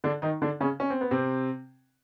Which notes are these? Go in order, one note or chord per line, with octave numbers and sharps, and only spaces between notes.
D3 D4
D#3 D#4
D3 D4
C#3 C#4
C#4
C4
B3
C3 C4